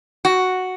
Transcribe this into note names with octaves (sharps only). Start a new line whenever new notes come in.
F#4